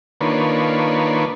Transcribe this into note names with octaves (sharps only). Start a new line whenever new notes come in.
D#3 A#3 D4 F4 B4 C#5